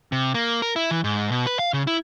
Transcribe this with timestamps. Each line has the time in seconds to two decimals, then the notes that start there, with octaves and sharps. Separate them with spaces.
0.12 C3
0.34 A#3
0.62 A#4
0.76 E4
0.91 E3
1.04 G#2
1.32 B2
1.47 B4
1.59 F5
1.73 C#3
1.87 E4